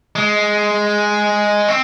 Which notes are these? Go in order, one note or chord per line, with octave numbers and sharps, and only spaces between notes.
G#3
C4